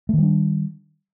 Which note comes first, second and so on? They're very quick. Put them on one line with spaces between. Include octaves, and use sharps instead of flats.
A3 D#3 G3 D4